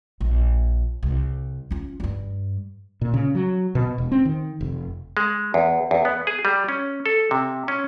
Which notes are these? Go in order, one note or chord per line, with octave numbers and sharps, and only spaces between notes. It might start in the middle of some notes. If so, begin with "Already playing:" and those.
A#1
C2
C#4 F4
G2 G3
A#2
C#3
F#3
B2
E1
C4
D#3
F1
G#3
E2
E2
B3
G#4
G3
C#4
A4
C3
C#4